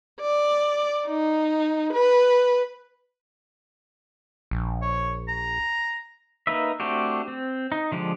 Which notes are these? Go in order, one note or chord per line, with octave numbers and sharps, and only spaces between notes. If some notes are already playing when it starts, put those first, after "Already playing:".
D5
D#4
B4
A#1
C#5
A#5
A#3 D#4 B4 E5
A3 C4 D4 F#4 G4
C4
D#4
D3 F3 G#3 G4